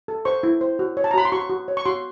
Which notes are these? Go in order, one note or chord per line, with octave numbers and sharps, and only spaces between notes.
A4
C5 C#6
E4
C5
F#4
C#5
A5
A#5
F#4 B5
C6
F#4 C#6
F#4
C#5
C#6
F#4 C6